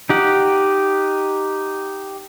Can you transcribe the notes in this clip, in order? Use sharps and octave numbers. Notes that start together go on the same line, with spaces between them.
D#4 G4 F#5